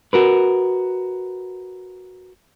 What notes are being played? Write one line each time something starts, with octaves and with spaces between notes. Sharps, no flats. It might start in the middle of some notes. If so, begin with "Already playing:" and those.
F#4 A#4 B4